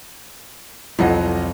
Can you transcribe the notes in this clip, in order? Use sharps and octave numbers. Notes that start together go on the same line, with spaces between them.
C2 F2 F#3 E4 F4 D#5 F#5